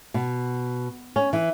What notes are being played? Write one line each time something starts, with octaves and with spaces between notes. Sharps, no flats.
B2
C#4
E3